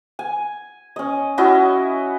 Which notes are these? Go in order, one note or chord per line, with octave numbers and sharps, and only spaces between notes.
G#5
C#4 D#5
C#4 E4 F#4 D#5